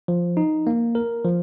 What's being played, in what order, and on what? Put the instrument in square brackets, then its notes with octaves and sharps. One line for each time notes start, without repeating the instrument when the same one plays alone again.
[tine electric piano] F3
D#4
A#3
A#4
F3